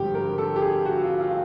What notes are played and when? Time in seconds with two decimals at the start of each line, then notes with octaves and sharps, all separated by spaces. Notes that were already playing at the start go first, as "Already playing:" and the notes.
Already playing: G#1 G2 D3 F3 G4
0.15 A#4
0.38 A4
0.56 G4
0.62 G#4
0.85 F#4
1.03 F4
1.21 F4